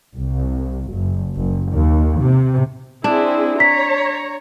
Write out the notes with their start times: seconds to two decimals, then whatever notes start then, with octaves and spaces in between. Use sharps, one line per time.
0.15 C2
0.90 F#1
1.34 F#1
1.72 D#2
2.18 C3
3.04 C4 D4 E4 G#4
3.60 C#5 A#5 B6